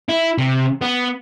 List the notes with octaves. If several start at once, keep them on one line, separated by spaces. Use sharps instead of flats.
E4
C3
B3